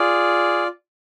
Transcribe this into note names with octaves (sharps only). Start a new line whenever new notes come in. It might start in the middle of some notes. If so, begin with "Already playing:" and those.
Already playing: F4 G#4 D5